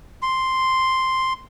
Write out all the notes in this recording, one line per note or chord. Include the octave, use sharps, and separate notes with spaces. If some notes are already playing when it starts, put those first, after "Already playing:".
C6